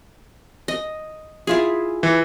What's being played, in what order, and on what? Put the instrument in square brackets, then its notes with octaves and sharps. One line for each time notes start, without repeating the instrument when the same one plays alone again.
[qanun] D#5
E4 F4 G#4
[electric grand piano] E3